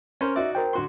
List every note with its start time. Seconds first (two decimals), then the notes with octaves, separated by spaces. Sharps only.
0.21 C#4 A#4 C5
0.36 D#4 F#4 D5 E5
0.55 A#4 C5 G5
0.73 D2 F#4 C6